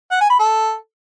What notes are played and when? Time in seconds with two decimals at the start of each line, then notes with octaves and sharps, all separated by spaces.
0.11 F#5
0.21 G#5
0.30 B5
0.39 A4